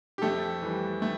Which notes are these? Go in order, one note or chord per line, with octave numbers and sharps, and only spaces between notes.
G4
F2 A3 A4
E3 G3
A3